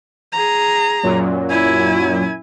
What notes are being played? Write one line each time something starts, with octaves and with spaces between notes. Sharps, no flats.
G#4 A#5
F#2 A#2 F#3
E4 G#5